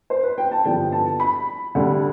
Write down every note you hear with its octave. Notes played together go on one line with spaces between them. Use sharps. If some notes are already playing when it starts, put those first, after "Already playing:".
C5
B4
G5
A5
G2 D3 F3 B3 G5
A5
B5
D2 D3 G3